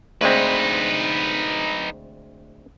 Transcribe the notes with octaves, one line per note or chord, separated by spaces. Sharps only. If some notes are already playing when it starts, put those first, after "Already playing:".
D2 G#3 C4 D#4 B4